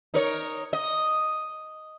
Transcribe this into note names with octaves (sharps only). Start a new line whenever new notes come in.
D#4 A#4 C#5
D#5